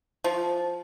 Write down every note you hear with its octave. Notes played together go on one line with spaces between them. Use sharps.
F3